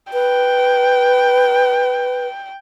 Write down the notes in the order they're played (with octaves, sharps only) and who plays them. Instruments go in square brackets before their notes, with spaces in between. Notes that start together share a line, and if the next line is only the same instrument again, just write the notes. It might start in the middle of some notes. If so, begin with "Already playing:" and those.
[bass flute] B4 [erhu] G5